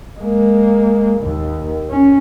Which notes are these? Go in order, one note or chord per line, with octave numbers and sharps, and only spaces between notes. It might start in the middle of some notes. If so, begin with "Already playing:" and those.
G#3 A#3
D#2
C#4